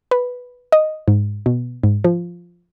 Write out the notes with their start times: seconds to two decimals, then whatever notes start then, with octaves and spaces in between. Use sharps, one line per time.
0.11 B4
0.72 D#5
1.08 G#2
1.46 B2
1.84 G#2
2.04 F3